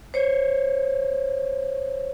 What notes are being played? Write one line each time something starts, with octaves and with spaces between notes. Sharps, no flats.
C5 C#5